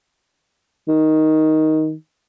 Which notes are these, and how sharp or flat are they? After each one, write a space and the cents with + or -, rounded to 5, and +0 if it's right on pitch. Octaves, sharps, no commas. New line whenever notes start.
D#3 +5